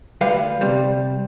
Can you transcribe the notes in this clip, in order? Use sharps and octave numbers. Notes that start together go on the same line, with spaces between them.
D2 G3 B4 F5
C3 G3